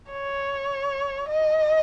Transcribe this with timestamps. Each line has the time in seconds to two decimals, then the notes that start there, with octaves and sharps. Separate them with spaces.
0.11 C#5
1.28 D#5